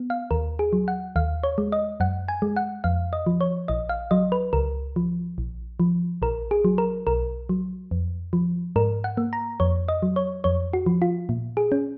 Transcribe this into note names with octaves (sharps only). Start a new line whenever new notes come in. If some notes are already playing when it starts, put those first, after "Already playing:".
Already playing: B3
F5
D#2 A#4
G#4
F#3
F#5
D#2 F5
C#5
G#3
D#5
F#2 F#5
G#5
G#3
F#5
F2 F5
D#5
F3
C#5
A#1 D#5
F5
F#3 D#5
B4
C#2 A#4
F3
A#1
F3
A#1 A#4
G#4
F#3
A#4
B1 A#4
F#3
F2
F3
G#2 A#4
F#5
A#3
A#5
F2 C#5
D#5
F#3
C#5
F2 C#5
F#4
F3
F4
A#2
G#4
C#4